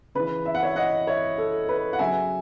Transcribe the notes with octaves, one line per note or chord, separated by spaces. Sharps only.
C#3 E3 B4
E5
F#5
C#5 E5
D#5 F#5
C#5 E5
A4
B4
F#5
C#3 F#3 E5 G#5